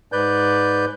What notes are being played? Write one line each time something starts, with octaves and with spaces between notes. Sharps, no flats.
G#2 B4 D5 G6